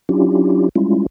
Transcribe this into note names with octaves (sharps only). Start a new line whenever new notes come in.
F#3 C#4 D4 E4 F4 G4
G3 G#3 C#4 E4 F4